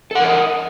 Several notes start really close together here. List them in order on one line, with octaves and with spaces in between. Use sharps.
A4 F#5 A#4 C#5 D#5